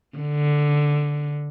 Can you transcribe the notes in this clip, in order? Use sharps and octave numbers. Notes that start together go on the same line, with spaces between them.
D3